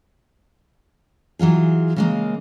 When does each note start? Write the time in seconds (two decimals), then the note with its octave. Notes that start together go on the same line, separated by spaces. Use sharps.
1.39 E3 F#3 F4 G#4
1.96 C#3 G#3 A#3